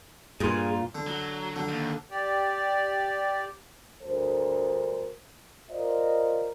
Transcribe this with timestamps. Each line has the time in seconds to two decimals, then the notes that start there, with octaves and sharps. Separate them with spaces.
0.40 G2 A#2 F4 G#4 C6
0.95 D3
1.07 F#3
1.56 D3
1.69 D#2
2.10 G4 D5
4.03 D2 G2 A4 A#4 C5
5.70 F4 A#4 C5 D5 D#5